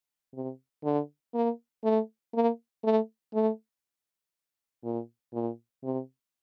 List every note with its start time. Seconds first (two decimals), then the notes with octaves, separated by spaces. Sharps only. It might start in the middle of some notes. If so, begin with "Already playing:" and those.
0.34 C3
0.84 D3
1.34 A#3
1.84 A3
2.34 A#3
2.84 A3
3.34 A3
4.84 A#2
5.34 A#2
5.83 C3